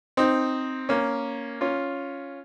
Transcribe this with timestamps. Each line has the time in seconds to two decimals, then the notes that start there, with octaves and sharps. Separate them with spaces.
0.17 C4 D#4
0.89 A#3 C#4
1.61 C#4 F4